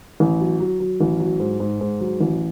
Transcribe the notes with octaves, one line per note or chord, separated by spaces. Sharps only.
A1
F#3
F#3
F#3
A1
F#3
G#2
G#2
G#2
F#3
A1